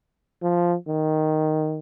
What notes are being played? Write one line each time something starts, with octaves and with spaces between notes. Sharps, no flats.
F3
D#3